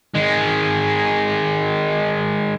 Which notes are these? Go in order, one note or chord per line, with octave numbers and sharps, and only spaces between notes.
D#3 G#3